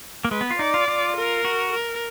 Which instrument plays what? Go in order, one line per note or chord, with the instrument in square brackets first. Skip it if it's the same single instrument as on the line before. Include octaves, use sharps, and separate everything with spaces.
[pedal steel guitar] A#3
[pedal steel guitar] G#3 [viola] B4
[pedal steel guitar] B3
F4
[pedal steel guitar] D#4 [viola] D5
[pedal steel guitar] F4
F4
[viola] A#4
[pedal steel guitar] F#4
[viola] A#4